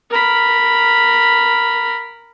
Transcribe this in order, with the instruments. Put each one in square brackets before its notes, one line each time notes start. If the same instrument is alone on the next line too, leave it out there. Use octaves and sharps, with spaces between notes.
[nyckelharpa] A#4 B5